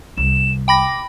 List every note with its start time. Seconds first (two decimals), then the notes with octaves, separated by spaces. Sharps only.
0.17 C2 E7
0.68 G5 B5 D6 A#6